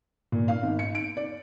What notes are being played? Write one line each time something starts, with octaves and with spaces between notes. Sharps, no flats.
A#2
F5
G#1
C#7
D7
D5